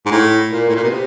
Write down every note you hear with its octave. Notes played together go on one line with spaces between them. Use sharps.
G#2
A2
A#2
A2
A#2
B2
C3